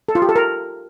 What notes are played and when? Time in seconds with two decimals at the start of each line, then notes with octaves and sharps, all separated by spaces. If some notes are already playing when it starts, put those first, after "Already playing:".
0.09 A4
0.15 F4
0.22 G4
0.29 A4
0.36 A#4